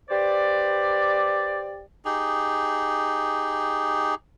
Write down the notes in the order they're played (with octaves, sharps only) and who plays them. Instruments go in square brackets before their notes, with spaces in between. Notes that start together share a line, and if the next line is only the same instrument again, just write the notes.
[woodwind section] G4 B4 C5 D5
[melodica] D#4 G4 G#4